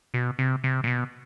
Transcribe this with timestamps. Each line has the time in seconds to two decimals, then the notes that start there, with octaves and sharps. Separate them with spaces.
0.14 B2
0.39 C3
0.64 C3
0.84 A#2
0.87 B2